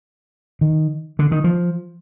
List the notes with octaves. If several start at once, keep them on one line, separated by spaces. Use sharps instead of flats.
D#3
D3
D#3
F3